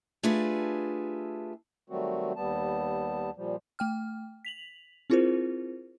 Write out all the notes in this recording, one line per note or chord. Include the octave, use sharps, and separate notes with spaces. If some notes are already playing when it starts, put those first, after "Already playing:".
A3 D4 F4 G4 G#4 B4
D#3 F#3 G3 A3 C4 F#4
D#2 G3 B3 A5
A#2 F3 G3
A3 G5 F6
B6 F7 F#7
C4 E4 F4 G#4 A#4 C5